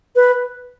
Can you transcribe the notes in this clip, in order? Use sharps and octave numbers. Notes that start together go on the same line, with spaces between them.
B4